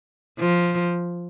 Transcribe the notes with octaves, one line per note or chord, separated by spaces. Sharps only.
F3